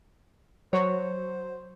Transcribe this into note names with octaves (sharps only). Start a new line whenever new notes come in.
F#3 C5 C#5